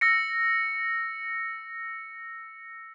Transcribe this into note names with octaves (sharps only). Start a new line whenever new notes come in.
E6 A#6 C#7